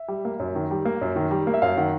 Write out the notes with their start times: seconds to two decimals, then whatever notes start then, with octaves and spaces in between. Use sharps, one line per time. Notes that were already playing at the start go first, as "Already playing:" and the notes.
Already playing: E5
0.08 G3
0.25 A#3
0.40 F#2
0.55 D#3
0.71 G3
0.85 A#3
1.01 F#2
1.16 D#3
1.31 G3
1.47 A#3
1.54 E5
1.62 F#2 F5
1.77 D#3 F#5